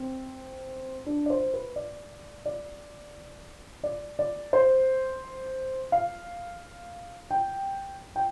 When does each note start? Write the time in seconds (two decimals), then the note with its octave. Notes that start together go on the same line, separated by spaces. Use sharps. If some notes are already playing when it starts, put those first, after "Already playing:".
Already playing: C4
1.06 D4
1.26 D5
1.30 C5
1.54 B4
1.76 D5
2.46 D5
3.84 D5
4.19 D5
4.53 C5
5.92 F5
7.31 G5
8.16 G5